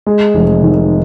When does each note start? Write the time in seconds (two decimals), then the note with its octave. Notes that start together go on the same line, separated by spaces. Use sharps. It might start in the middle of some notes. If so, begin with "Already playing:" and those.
0.06 G#3
0.34 F1
0.62 D#3